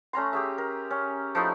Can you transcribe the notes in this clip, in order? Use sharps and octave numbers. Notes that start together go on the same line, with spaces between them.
A3 C#4 A#5 C6
G4 G#4 E5
A#4
C#4
F3 A3 D#4 E4